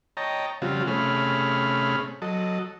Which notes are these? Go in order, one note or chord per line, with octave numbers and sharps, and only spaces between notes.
C#5 D#5 G5 A5 A#5
C#3 F3 G3 C4 F4 F#4
C3 A3 C#4 G#4 B5 F6
F#3 A4 D#5